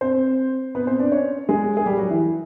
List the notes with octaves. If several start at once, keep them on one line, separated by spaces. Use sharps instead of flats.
C4 C5
B3 B4
C4 C5
D4 D5
C#4 C#5
G#3 G#4
G#4
G3 G4
F#3 F#4
E3 E4